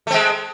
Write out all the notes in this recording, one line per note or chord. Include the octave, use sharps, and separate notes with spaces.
G#3 A3 C4